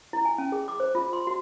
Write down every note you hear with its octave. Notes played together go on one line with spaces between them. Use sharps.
E4
G#5
C#4
G#4
D6
C5
F4
C6
F#4